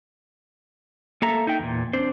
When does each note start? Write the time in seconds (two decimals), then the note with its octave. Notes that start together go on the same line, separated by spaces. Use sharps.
1.22 A#3 A4 E5 A#5
1.47 D#4 E5 G5
1.59 E2 A#2
1.93 C4 D4 C5